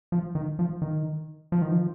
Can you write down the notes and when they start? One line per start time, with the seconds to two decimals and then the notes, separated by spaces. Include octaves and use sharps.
0.12 F3
0.35 D#3
0.59 F3
0.82 D#3
1.52 F3
1.62 D#3
1.72 F3